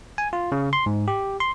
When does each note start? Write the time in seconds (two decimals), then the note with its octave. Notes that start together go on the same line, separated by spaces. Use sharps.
0.18 G#5
0.33 F4
0.52 C#3
0.73 C6
0.86 G#2
1.08 G4
1.40 C6